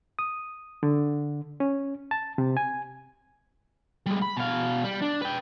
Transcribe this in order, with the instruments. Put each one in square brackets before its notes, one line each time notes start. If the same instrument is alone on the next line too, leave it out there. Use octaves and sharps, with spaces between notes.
[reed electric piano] D#6
D3
C#4
A5
C3
G#5
[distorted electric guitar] G3 G#3
B5
B2 F5
G3
D4
B4 G5